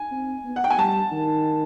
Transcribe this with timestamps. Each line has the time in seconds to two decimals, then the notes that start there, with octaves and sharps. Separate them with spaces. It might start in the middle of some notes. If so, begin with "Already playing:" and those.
Already playing: G#5
0.11 C4
0.45 B3
0.56 F#5
0.64 G5
0.70 G#5
0.78 G3 A5
1.12 D#3